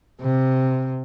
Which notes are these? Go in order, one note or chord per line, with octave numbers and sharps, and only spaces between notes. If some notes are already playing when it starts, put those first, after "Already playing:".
C3